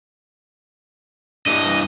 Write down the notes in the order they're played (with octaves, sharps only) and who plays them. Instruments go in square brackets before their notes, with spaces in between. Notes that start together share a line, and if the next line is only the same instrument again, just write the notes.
[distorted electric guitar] G2 E3 [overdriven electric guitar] D#5